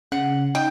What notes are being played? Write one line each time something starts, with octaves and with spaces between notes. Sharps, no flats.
C#3 F#5
D#4 G5